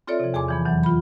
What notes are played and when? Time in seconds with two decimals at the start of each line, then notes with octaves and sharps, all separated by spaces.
0.07 C4 F4 A4 C#5 D5 E5
0.20 C3 F3
0.34 E2 G#4 G#5 A5 C6 D6
0.48 E3 F3 B3
0.65 F2 E3 F#3
0.83 F4 B5